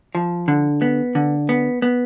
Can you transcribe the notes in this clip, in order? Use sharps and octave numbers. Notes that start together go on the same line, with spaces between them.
F3
D3
B3
D3
B3
B3